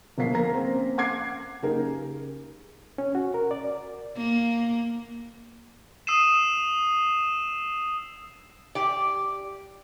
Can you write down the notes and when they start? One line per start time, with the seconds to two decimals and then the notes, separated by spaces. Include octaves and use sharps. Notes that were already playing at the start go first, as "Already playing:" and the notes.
0.18 G1 B2 F3 A#3 B6 C7
0.34 A#4 A#5 A#6
0.53 A#3 C4 C#4
0.98 F#5 D6 G#6 C7
1.63 F#1 C#3 C#4 D#4 G4 A#4
2.98 C#4
3.15 F#4
3.34 A#4
3.51 D5
4.17 A#3
6.07 D#6 E6 C7 D#7 E7
8.75 G4 D5